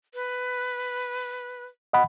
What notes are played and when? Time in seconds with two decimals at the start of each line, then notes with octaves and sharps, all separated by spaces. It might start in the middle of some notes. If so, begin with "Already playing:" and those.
0.14 B4
1.93 D#5 F#5 B5